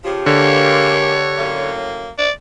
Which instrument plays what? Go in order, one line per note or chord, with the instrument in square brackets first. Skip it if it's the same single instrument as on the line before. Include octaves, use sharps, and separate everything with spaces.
[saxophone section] C#3 F3 [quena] G4
[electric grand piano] D3 [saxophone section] G#3 A#3 [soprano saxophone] C#5
[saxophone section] F#2 A2 A#3
[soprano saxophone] D5